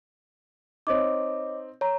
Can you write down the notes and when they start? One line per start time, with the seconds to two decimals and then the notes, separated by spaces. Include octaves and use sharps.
0.87 C4 D#4 C#5 D#5 D6
1.81 C#5 A#5